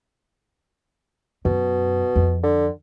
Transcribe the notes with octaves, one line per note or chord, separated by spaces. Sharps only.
F#2 B2
F2
D3